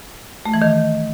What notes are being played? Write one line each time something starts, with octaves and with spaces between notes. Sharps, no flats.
A3
E3
D#3